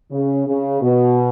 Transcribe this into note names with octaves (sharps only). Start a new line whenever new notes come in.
C#3
C#3
B2